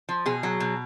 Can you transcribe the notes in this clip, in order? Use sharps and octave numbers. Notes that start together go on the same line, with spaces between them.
F3
B2 G#4
F#3
B2